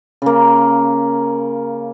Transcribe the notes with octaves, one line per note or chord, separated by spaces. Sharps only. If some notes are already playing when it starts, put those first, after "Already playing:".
C#3 A#3